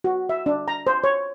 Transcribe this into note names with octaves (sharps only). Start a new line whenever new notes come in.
F#4
E5
D4
A#5
C5
C#5